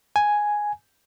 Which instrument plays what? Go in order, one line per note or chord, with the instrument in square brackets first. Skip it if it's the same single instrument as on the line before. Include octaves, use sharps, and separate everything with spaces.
[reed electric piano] G#5